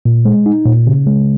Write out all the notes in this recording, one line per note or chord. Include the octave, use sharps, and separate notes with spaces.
A#2
G#3
D#4
A#2
C#3
G#3